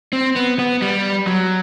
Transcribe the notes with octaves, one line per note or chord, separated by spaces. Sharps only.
C4
B3
B3
G3
F#3